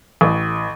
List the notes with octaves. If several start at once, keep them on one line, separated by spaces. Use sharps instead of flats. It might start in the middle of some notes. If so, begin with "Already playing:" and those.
A1